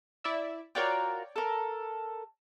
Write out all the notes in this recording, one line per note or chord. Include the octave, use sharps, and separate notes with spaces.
E4 D5 E5
F4 F#4 A#4 C#5 D5 G5
A4 A#4